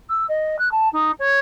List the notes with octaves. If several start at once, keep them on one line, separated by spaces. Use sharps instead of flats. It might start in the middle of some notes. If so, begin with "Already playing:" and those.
E6
D#5
F#6
A5
D#4
C#5